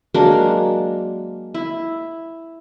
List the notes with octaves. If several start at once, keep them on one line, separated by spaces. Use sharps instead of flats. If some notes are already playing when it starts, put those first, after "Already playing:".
F#3 G#3 A#3 D4
E4